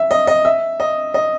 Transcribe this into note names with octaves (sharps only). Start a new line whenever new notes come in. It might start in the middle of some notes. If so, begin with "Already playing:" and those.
Already playing: E5
D#5
D#5
E5
D#5
D#5